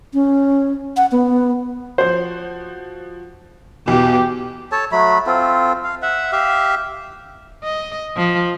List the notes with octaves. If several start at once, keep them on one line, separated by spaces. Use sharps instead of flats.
C#4
F#5
B3
F3 F#4 C5
B1 E2 B2 G4
A4 C#5 A5
F#3 A3 B5
C4 F4 A4
F5
E5 F#5
G4 E5 F5
D#5
F3